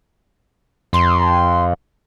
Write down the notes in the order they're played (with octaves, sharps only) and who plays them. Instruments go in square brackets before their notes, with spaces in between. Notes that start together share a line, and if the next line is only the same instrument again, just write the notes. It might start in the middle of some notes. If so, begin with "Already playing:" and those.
[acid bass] F2 [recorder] C6